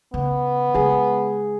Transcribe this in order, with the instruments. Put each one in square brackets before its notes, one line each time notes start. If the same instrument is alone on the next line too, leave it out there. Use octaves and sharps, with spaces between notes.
[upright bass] C#3 [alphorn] B3
[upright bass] C#3 G#3 [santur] G#4